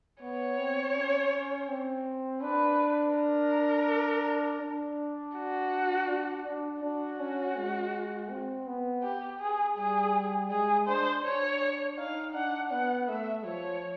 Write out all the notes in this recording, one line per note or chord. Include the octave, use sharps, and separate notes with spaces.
B3 C#5
C4
C#4
C4
D4 B4
A#4
D4
F#4
D4
D4
D4 F#4
C#4
G#3
C4
B3
G4
G#4
G3 G#4
G#3 G#4
D4 C5
D4 C#5
D#4 F5
D4 F#5
B3 F#5
A3 E5
F3 C#5